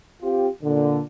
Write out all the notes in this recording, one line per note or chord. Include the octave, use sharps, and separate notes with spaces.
C4 F4 G4
A#2 D3